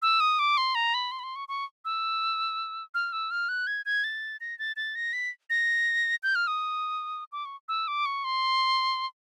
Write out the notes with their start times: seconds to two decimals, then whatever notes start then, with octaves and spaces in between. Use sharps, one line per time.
0.02 E6
0.20 D#6
0.39 D6
0.57 C6
0.75 A#5
0.94 B5
1.12 C6
1.19 B5
1.24 C6
1.36 C#6
1.48 C#6
1.85 E6
2.94 F6
3.12 E6
3.31 F6
3.49 F#6
3.67 G#6
3.86 G#6
4.04 A6
4.41 A#6
4.59 A6
4.76 A6
4.95 A#6
5.13 B6
5.50 A#6
6.23 G6
6.35 F6
6.47 D#6
7.32 D6
7.45 C#6
7.69 E6
7.88 D6
8.06 C#6
8.24 C6